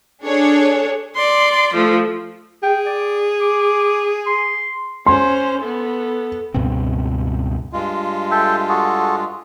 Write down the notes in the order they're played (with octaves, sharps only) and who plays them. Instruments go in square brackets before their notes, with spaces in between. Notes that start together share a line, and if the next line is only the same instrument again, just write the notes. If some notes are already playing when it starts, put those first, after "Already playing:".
[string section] D4 G#4 A4 C#5
[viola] D5 C6
F3 A3
[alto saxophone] G#4 [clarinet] G5
[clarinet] D5
D6
C6
[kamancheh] C#4 C5 [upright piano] C6
[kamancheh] B3 A4
[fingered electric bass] C#2 G2 B2 C4
[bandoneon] G2 G#3 F4
[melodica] A4 E5 G5
F#4 G#4 A4